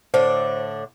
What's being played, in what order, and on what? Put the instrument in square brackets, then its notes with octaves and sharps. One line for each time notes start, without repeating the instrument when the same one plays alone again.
[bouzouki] A2 D3 D4 [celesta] C5